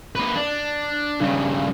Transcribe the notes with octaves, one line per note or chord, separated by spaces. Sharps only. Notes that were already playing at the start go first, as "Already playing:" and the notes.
A#3 B4
D4
G2 C#3